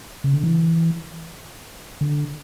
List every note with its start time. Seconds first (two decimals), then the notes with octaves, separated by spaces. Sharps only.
0.24 C#3
0.33 D3
0.43 E3
2.01 D3